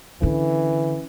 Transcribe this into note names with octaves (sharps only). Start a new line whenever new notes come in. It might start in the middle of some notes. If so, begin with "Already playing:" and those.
D3 E3 C#4 E4